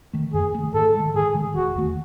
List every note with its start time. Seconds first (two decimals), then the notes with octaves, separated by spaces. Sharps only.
0.13 D#3 A3
0.34 F#2 G#4
0.54 D#3 A3
0.74 G#2 A4
0.95 D#3 G#3
1.15 G#2 G#4
1.34 D#3 G#3
1.55 E1 F#4
1.75 E2 D#3 A3